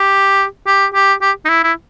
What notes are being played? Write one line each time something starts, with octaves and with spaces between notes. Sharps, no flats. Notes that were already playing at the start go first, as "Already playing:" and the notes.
Already playing: G4
G4
G4
G4
D#4
E4
E4